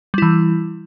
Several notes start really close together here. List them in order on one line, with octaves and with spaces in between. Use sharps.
G3 E4 E3